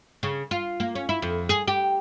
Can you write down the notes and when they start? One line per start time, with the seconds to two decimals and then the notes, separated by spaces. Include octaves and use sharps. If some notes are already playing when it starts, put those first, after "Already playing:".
0.23 C#3
0.51 F4
0.80 A#3
0.95 C#4
1.09 E4
1.22 F2
1.49 G#4
1.67 G4